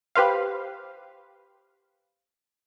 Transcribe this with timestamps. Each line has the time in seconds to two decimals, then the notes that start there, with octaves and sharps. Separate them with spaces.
0.15 G4 B4 C5 F5